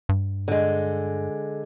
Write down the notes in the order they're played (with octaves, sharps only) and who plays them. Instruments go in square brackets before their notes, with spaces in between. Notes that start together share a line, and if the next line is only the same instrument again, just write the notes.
[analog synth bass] G2
[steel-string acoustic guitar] D3 G#3